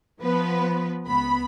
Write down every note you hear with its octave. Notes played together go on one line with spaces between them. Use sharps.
F3 B3 B4
C#2 B3 B5